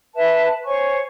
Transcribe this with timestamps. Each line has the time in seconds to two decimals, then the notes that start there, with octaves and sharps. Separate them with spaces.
0.14 B4 E5 A5
0.65 C5 C#5 G#5 C#6